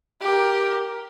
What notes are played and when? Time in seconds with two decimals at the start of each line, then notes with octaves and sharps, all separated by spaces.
0.22 G4 A#4